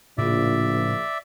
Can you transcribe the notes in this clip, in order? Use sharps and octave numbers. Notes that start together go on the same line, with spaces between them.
A#1 A2 C#3 D5 E5